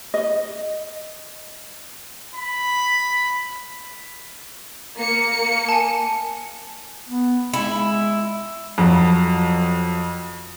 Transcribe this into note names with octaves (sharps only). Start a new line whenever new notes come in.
D#5
B5
A#3 C#7
G#5 A5
B3
G#3 E4
F2 F#3